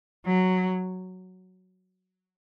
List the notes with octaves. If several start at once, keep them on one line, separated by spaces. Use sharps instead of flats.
F#3